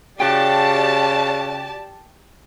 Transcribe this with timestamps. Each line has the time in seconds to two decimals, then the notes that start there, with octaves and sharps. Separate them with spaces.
0.20 C#3 F#4 G4 D5 G5 A5